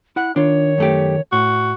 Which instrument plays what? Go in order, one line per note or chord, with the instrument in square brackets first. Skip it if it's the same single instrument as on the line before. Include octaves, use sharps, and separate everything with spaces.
[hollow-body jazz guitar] E4 F#5 [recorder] F#6
[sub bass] D#3 [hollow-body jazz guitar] D4 F4 [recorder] C#5
[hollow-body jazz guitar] F#2 A3 G4
[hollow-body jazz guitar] A2 [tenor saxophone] F#4